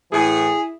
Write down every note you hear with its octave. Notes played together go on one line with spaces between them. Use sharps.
A2 E3 E4 G#4